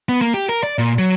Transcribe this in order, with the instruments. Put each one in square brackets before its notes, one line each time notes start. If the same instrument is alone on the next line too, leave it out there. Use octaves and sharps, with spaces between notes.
[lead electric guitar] B3
A#3
G4
A#4
D5
A#2
F#3